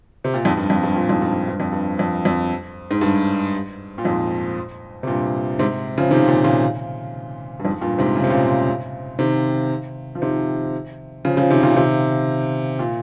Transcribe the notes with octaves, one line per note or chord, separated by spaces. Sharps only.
C3
A#2
F2 G#2
G2
F2
G2
G2 A#2
F2 G#2
G2
G2
G2
F2
G2
F2
F2
G#2
G2
A#2
F2 G#2
C3
G2 A#2
G#2 C3
C#3 F3
C3 D#3
A#2 C#3
A#2 C#3
G2
F2 G#2
G2 A#2
G#2 C3
C#3
C3
A#2 C#3
C3 D#3
F3
C3 D#3
C#3 F3
C#3 F3
C3 D#3
A#2 C#3
C3 D#3
A#2